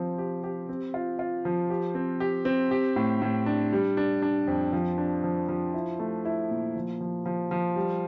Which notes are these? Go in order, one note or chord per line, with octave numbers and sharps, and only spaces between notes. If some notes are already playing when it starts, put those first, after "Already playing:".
Already playing: F3 C4
G4
G4
C4
F4
F4
F3
G4
C4
G4
C4
G4
A2
A2
D4
G3
D4
D4
F2
F3
D4
F3
F3
E4
A3
E4
A#2
F3
F3
F3
F3
G3